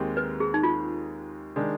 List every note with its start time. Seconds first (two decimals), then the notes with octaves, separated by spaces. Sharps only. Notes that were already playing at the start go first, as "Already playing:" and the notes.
Already playing: D#2 D#3 G#3 C4 G4
0.17 B4
0.40 G#4
0.54 D#4
0.63 F4
1.56 D#3 G#3 D4